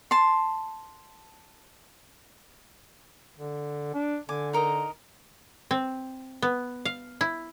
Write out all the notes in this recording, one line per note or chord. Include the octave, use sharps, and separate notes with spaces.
A5 C6
D3
D4
D3 G#5 D6
D#4 A#4 D#5
C4
B3
F5
E4